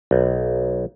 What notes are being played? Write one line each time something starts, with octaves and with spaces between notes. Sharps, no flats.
B1